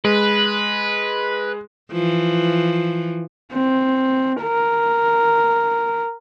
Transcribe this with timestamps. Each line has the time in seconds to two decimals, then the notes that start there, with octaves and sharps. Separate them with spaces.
0.05 G#3 B4
1.91 E3 F3
3.53 C4
4.42 A#4